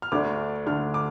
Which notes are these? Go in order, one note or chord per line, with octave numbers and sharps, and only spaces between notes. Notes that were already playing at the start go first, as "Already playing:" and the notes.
F6
D2 D3 A3 D4 D6
D2 D3 A3 D4 F6
D6